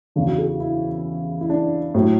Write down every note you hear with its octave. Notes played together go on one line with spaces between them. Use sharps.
E2 C#3 E3 D4
F#4
G#4
F#4
E4
E4
D4
A2 F#3